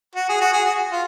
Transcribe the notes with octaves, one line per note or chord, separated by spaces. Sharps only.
F#4
G#4
F#4
G#4
F#4
F4